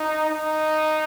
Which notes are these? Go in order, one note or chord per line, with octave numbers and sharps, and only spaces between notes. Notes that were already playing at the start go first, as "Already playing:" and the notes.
Already playing: D#4
D#4